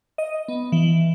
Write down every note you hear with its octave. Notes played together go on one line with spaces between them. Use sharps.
D#5
B3
E3